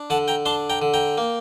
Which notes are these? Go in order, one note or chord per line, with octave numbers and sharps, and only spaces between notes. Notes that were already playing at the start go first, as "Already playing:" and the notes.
Already playing: D4
D3 F#5 A5
G5 A#5
D4 A5 C6
G5 A#5
D3
G5 A#5
A#3